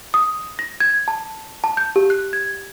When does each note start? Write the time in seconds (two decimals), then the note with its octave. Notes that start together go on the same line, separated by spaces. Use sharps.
0.14 D#6
0.59 A#6
0.80 G#6
1.08 A5
1.64 A5
1.77 G6
1.96 G4
2.10 F#6
2.33 G#6